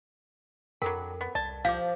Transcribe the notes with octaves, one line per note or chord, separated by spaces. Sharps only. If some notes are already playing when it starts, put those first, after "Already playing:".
F2 F#3 D4 A4 A#4 G5 B5
B3
C2 D5 A5
F3 G4 F5 D6